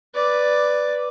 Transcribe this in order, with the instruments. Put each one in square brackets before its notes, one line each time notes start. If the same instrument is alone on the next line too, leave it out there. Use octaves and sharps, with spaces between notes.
[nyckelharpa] B4 D5